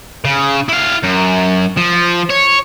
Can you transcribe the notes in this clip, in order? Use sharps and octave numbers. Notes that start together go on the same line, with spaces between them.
C#3
E4 F5
F#2
F3
C#5